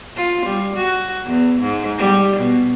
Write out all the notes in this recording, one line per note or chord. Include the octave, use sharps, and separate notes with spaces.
F4
G3
F#4
E2
G#2
G3
B2